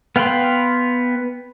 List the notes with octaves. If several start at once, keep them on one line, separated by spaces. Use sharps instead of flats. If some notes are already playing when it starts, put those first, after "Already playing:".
B3 F5 G5 B5 C6